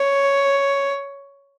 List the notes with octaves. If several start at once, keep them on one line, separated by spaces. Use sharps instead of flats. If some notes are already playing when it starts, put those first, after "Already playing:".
Already playing: C#5